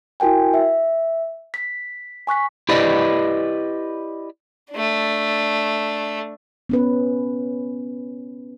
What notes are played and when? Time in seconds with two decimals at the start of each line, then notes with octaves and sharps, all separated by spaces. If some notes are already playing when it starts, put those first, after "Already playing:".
0.20 E4 F#4 A#4 G5 G#5
0.54 E5
1.54 B6
2.27 G#5 C#6 F#6 B6
2.69 E4 G4 B4 D5 D#5
4.72 A3 D4
6.69 B3 C#4 B4